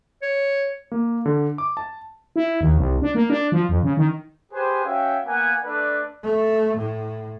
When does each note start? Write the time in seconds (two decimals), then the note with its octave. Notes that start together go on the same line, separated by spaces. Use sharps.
0.22 C#5
0.92 A#3
1.26 D3
1.58 D6
1.77 A5
2.36 E4
2.61 D#2
2.77 C2
3.02 D4
3.15 A#3
3.30 D4
3.52 F3
3.69 F2
3.83 C#3
3.97 D#3
4.52 G4 G#4 B4 C5 G5 G#5
4.85 C#4 F#4 E5 F5 G5
5.26 A#3 B3 F#5 G#5
5.64 A3 D4 B4 D5
6.24 A3
6.77 A2